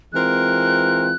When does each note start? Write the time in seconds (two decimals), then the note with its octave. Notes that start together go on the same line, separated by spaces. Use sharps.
0.13 E3 G#3 C4 F4 A#4 F#6